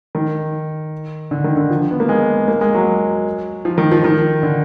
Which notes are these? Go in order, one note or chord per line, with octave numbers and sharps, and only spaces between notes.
D#3
D3
D#3
D3
F3
B3
A#3
G#3
A#3
G#3
F#3
F3
D#3
F3
D#3
D3